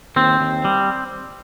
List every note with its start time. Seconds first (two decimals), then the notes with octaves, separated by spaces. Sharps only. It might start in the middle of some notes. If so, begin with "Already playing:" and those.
0.16 D#2 C4
0.41 D#2
0.65 G3